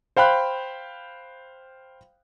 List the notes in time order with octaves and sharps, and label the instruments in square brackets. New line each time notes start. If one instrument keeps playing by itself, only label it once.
[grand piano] C5 F5 G5 B5 F#6